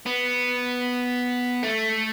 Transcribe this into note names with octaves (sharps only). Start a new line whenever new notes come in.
B3
A3